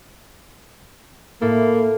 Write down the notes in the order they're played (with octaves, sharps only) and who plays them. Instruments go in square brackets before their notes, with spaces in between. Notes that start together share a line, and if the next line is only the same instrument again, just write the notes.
[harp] A2 E4 A4 [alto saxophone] A#3